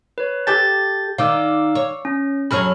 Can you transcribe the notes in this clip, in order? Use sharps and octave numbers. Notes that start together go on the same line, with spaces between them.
B4 C#5
G4 A4 A5 G6 A6
D#3 D#4 D5 F5 D6 E6
C#5
C#4
F#2 F#3 G#4 A4 C#5 B5 F6